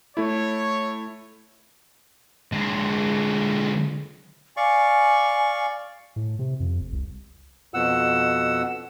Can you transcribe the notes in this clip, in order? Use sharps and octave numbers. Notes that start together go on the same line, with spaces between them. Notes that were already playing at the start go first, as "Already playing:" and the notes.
A3 E4 C#5
D3 G#3
D5 F5 G#5 C#6
A2
C3
F2
F1
C2
F2 B2 F#5 E6